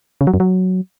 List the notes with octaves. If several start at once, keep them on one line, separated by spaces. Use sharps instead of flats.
C#3
F#3
F#2
F#3